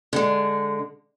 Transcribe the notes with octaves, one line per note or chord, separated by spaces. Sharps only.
D3 G#3